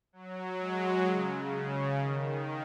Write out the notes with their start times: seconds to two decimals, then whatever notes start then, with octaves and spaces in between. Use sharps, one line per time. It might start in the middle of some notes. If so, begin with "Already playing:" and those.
0.13 F#3
0.59 G#3
1.06 C#3
1.99 D#3